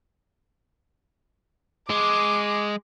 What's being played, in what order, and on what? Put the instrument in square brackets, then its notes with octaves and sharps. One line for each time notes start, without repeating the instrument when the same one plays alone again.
[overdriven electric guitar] G#3 [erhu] D6